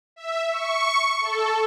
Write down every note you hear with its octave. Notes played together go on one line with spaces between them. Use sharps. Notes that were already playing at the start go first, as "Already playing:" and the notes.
E5
C#6
A4